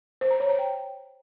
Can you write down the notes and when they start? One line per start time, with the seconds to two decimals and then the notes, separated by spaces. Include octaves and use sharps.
0.21 C5
0.31 A#5
0.40 C#5
0.49 A#5
0.59 G5